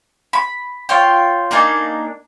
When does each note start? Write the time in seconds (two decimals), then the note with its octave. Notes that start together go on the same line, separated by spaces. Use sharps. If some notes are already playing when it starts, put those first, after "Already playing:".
0.33 B5
0.89 F4 C#5 G5
1.51 A#3 D4 D#4 G#5